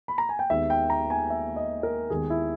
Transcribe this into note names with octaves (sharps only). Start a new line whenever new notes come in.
B5
A#5
G#5
G5
D#2 D#3 G#3 B3 E5
G5
A#5
G#5
E5
D#5
A#4
D#2 D#3 G#3 B3 G#4
E4